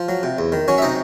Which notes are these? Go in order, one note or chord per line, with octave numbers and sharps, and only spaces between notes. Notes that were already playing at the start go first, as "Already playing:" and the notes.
Already playing: F3
F#3
C3
E2
D#3
F#3 C#4 C#5
E5
C3 D#4 D#5